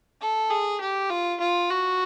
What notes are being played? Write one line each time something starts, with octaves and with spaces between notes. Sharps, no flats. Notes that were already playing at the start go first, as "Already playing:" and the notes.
A4
G#4
G4
F4
F4
F#4